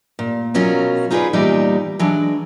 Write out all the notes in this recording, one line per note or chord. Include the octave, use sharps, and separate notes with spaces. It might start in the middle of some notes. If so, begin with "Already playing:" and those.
A#2
B2 F#3 C#4 F4 A#4
D#4 F4 G#4 A4 B4 D5
E2 A#2 G3 D#4 D5
E3 F#3 G#3 D4